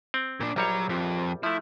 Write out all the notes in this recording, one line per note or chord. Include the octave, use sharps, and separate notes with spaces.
C4
A#2 D4
A#1 F#3 G3 C#5 A#5
F2 F3
F3 A3 E4